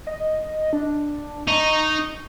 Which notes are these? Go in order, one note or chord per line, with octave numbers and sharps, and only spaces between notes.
D#5
D4
D#4 C#6